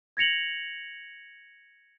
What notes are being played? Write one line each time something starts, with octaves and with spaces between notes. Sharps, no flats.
G#6 A#6 C#7 F7 F#7